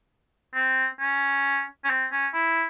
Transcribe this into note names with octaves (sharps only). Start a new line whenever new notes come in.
C4
C#4
C#4
C4
C#4
E4